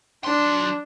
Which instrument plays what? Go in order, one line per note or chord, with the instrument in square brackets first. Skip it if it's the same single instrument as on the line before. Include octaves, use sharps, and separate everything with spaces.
[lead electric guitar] F#3 C6 [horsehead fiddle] D4